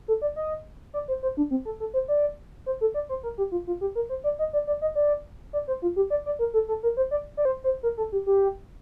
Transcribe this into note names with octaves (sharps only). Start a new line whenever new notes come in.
A4
D5
D#5
D5
C5
C5
D4
C4
A4
A4
C5
D5
C5
A4
D5
C5
A#4
G4
F4
F4
G4
A#4
C5
D5
D#5
D5
D5
D#5
D5
D5
C5
F4
G4
D5
D5
A#4
A4
A4
A#4
C5
D5
D5
C5
C5
A#4
A4
G4
G4